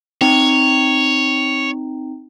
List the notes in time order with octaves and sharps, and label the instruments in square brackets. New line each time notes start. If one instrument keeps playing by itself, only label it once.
[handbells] C4 D#4 [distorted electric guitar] C#5